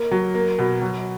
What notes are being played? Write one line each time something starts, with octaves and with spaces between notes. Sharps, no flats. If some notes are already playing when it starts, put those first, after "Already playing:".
Already playing: A#3
F#3
A#3
B2
F#3